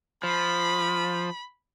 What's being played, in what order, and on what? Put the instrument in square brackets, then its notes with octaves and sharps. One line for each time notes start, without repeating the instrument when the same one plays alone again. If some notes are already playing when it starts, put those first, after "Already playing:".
[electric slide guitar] F3 [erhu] B5